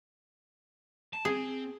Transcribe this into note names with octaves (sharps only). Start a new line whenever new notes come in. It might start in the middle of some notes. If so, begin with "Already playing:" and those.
A5
C4 G#4